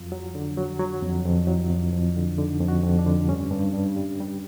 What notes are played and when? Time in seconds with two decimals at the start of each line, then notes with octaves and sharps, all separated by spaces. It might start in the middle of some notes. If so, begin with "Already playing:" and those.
Already playing: F2 F#3 F4
0.12 F#3
0.35 D3
0.57 F#3
0.80 F#3
1.02 F2
1.26 F2
1.47 F#3 E4
1.70 F2
1.92 F2
2.16 D3
2.38 D3 D#4
2.60 F2
2.68 F#4
2.83 F2
2.99 D4
3.07 D3
3.28 G2 C#4
3.51 G2
3.74 G2
3.96 G3
4.20 G3